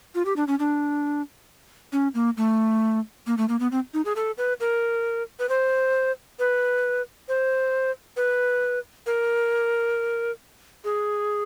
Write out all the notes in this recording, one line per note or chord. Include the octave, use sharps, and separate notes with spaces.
F4
G4
D4
C#4
D4
C#4
A#3
A3
A#3
A3
A#3
B3
C4
D#4
G#4
A4
B4
A#4
B4
C5
B4
C5
B4
A#4
G#4